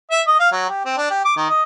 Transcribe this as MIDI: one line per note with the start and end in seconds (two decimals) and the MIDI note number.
0.11 0.22 76
0.27 0.38 75
0.39 0.50 77
0.52 0.67 54
0.69 0.84 67
0.85 0.95 60
0.97 1.10 62
1.10 1.22 67
1.25 1.33 86
1.37 1.47 51
1.49 1.63 75